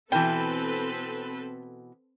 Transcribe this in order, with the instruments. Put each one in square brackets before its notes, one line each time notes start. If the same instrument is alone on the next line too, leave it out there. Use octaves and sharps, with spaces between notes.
[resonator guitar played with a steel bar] B2 E3 [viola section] C4 A4 B4 [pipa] G5